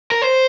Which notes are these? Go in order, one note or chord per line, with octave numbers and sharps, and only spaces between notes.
A#4
C5